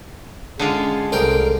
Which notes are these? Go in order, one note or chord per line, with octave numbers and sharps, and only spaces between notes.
D3 G#3 C#4 F4 G#4
C2 A4 A#4 G5